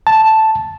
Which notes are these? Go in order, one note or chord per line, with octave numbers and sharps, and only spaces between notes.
A5